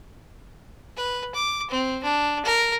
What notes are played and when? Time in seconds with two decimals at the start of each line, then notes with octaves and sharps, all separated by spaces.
0.97 B4
1.34 D6
1.70 C4
2.03 D4
2.44 A#4